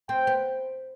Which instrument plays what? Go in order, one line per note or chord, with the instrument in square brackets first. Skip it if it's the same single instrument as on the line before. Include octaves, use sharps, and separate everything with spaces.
[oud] C4 [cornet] G5
[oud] B3